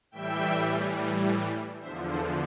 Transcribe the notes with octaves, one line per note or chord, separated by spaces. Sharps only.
A2 E3 G3 E5 G5
E2 D3 F3 C5 E5
C5